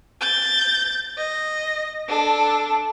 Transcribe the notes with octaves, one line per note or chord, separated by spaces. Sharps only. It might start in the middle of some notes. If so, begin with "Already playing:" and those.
G6 A6
D#5
D4 A4